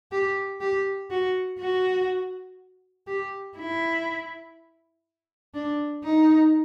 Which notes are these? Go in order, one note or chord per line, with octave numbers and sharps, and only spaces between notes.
G4
G4
F#4
F#4
G4
E4
D4
D#4